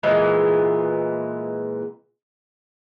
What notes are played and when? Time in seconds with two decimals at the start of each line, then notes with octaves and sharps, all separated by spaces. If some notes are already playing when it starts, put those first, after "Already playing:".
0.03 A#2 E3 G#3 B3